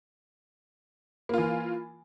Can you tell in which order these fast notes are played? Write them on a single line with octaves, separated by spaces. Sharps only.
A#3 F4 E3